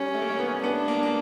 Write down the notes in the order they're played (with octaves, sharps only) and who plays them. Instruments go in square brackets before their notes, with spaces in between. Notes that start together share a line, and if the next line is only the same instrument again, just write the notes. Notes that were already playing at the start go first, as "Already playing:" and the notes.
Already playing: [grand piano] G3 [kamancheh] C#4
[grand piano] A3
A#3
A3
B3
[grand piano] B3 [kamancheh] D4
[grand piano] A#3
A#3